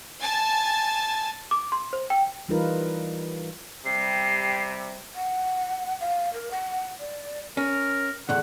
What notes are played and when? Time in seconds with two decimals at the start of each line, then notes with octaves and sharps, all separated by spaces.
0.21 G#5 A5 A6
1.51 D6
1.72 C6
1.93 C5
2.10 G5
2.49 E3 G3 D#4 F4 A#4 B4
3.86 C3 G3 C7
5.15 F#5
6.00 F5
6.33 A#4
6.51 F#5
6.99 D5
7.57 C#4 A#4
8.29 E2 A2 D3 F#5